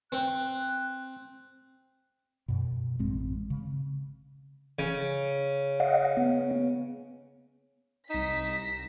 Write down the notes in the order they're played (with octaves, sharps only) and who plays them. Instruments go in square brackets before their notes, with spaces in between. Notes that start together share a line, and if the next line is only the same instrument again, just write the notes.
[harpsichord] C4 [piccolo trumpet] F#6
[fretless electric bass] F#2 B2
A1 G#3 C4
C#3
[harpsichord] C#3
[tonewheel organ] D#5 F5 F#5
B3
[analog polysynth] C2 A#6 E7 [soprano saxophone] D#4 [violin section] B6